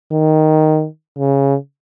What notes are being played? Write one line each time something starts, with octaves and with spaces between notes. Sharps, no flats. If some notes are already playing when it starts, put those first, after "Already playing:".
D#3
C#3